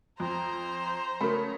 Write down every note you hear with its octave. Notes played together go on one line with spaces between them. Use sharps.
F2 C5 A#5
C#3 F#3 A3 A#4 B5